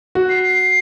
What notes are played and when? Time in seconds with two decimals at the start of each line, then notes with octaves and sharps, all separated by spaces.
0.15 F#4
0.29 C7
0.44 C7